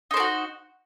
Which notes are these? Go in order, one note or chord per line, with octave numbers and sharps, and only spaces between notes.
D#4 F#4 A#4 C5